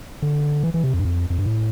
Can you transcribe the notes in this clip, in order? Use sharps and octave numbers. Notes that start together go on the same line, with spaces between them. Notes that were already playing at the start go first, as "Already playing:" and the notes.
D3
E3
E3
C3
F2
G2
F2
F2
G2
A2